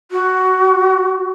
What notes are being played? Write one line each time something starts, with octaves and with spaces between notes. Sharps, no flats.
F#4